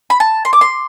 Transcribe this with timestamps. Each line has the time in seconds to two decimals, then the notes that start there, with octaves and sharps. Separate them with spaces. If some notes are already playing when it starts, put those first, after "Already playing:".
0.10 B5
0.20 A5
0.45 C6
0.53 D6
0.61 C6